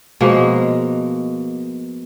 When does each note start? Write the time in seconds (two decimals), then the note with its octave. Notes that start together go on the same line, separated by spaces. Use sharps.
0.21 B2 F3 G#3 A#3